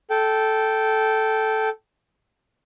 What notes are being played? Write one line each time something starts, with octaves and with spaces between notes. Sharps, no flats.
A4 G5